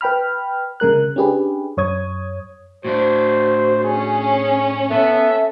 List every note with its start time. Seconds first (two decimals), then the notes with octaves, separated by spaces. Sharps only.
0.01 B4 G5 B5 F6
0.80 C#3 G#3 A#4 F#6
1.16 C#4 D4 G4 G#4 B4
1.77 F#2 C#5 D#6 G#6
2.85 A2 D4 F#4 C5
3.83 C#4 G#4
4.91 B3 A4 E5